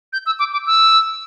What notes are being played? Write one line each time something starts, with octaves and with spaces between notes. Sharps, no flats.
G6
E6
D6
D6
E6